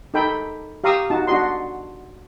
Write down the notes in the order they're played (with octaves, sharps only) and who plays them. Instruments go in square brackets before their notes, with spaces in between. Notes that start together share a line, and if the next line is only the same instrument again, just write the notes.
[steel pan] D#4 A4 G5 B5
G4 F5 A#5 C#6 D#6 E6
D#4 F#4 A5
D4 F#4 D#5 C6